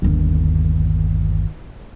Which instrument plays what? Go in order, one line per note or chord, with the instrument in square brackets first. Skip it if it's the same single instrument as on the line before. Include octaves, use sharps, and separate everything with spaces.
[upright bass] G1 D#2